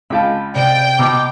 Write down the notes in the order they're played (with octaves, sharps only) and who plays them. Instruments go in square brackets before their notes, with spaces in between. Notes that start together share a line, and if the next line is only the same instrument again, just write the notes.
[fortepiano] C#2 F4 A5 [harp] G5 B5
[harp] C3 [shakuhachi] D5 [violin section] G5
[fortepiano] B2 [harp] A#5 G6 [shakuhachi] D6